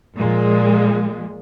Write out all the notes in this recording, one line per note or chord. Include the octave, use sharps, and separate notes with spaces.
A#2 F3 G#3